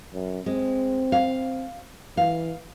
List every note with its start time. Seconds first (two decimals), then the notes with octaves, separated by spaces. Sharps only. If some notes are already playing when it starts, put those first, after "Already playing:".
0.13 F#2
0.46 G#3 C4
1.12 F5
2.17 E3 F5